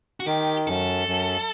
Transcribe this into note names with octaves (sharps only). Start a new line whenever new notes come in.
F#4
D#3 G4
F#2 A4
F#2